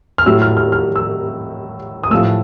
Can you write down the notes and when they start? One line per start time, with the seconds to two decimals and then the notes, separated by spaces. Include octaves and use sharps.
0.18 F6
0.26 A2 F#3 A3 E6
0.42 F6
0.57 F6
0.72 F6
0.96 E6
2.03 D#6
2.11 A2 F3 A3 E6